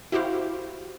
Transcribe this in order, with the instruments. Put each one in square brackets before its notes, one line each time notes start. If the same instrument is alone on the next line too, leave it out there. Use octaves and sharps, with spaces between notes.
[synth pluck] E4 F#4 G4 C5 F5